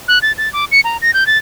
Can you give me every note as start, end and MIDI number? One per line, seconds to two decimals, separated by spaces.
0.08 0.19 90
0.22 0.32 93
0.38 0.51 93
0.53 0.65 86
0.72 0.81 97
0.84 0.97 82
1.02 1.14 94
1.14 1.26 91
1.27 1.38 93